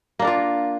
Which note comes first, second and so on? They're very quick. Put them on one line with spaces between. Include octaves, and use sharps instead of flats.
A#3 D4 A#4 F4